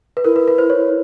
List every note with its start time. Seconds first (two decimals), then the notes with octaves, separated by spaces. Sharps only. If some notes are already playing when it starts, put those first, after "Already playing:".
0.17 B4
0.24 E4 A#4
0.36 B4
0.48 B4
0.58 C5
0.70 C#5